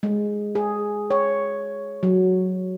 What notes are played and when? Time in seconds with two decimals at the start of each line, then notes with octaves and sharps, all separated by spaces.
0.03 G#3
0.55 G#4
1.10 C#5
2.03 F#3